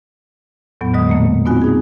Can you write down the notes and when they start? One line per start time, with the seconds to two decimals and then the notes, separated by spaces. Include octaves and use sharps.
0.81 E2 A2 F#3 B3
0.93 A2 D3 F#3 G#3 D#5 D#6
1.07 A#2 A3 A#3
1.45 B3 C4 D#4 F4 F#4 G#5
1.62 D#4 G#4